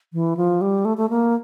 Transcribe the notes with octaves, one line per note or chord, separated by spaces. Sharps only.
E3
F3
G3
A3
A3
A#3